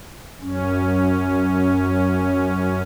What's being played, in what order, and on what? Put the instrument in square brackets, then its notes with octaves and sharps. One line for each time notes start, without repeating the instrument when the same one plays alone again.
[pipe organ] F#2 C#4